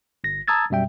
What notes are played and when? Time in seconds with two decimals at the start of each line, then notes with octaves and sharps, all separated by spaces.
0.24 G1 A#6
0.48 A5 A#5 D#6 E6 G#6 A6
0.70 F#2 B2 G3 E5 G5